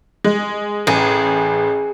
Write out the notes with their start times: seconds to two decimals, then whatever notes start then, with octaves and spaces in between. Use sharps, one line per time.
0.24 G#3
0.87 A1 G#4